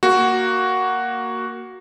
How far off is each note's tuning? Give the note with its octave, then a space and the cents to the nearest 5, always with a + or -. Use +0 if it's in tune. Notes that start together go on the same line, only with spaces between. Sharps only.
A#3 +0 F#4 +5